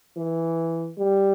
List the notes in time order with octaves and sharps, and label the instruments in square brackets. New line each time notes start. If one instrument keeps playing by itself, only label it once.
[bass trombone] E3
G3